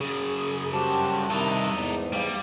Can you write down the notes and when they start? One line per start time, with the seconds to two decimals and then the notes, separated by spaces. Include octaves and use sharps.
0.01 F#2 C#3 G#4
0.73 G3 F#4 G4 C5 A5
1.30 C3 D#3 D#4 E4 A4
1.70 E2 G#2
2.13 G3 A3 F5